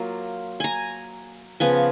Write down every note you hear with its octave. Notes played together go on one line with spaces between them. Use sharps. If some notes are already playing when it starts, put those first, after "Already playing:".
Already playing: F#3 A#3 F4
G#5 A#5
C#3 F3 B3 G#5